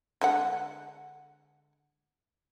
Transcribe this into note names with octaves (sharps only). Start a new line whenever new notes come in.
D3 G#3 F#5